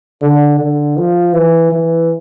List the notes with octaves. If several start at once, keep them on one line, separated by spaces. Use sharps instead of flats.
D3
D3
F3
E3
E3